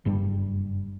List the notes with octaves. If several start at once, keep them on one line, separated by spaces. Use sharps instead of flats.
F#1 G2 G3